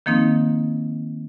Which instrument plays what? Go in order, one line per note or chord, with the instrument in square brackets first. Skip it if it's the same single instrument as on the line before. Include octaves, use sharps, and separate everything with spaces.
[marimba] D#3 F3 A#3 C4 D#4